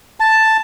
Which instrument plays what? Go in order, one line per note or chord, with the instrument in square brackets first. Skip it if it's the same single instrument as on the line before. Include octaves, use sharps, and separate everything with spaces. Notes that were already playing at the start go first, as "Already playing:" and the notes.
[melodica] A5